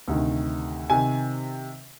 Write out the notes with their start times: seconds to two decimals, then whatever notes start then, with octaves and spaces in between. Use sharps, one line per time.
0.08 D2 C3 D#3
0.90 C3 D#3 G#5